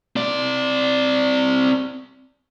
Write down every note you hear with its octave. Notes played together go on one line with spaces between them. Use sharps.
C4 D5